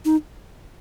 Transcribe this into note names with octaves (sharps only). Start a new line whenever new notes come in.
D#4